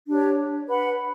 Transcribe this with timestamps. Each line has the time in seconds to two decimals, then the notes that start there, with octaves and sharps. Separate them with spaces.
0.08 D4 G4 C#5
0.69 B4 F#5 B5